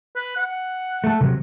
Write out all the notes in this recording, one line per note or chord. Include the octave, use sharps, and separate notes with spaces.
B4
F#5
A3 A4
C3 F#3